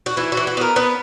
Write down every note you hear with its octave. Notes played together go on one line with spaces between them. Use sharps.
F#4
E3 E4
F#4
E3
F#4
B3 A#4
B3 B4